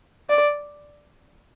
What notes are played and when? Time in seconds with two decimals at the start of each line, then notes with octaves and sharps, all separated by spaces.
0.30 D5